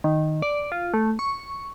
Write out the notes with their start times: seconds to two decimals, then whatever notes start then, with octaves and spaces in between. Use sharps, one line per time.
0.04 D#3
0.42 D5
0.72 F4
0.94 A3
1.19 C#6